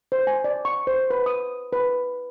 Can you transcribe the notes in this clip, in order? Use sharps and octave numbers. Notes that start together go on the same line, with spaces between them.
C5
G#5
D5
C#6
C5
B4
D#6
B4